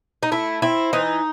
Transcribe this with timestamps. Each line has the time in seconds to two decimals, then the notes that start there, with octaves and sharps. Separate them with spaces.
0.23 D#4
0.31 A3 E4
0.62 C4 E4
0.93 E3 D#4